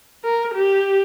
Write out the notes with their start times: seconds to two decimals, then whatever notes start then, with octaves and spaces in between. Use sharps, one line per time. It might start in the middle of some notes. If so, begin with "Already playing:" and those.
0.24 A#4
0.54 G4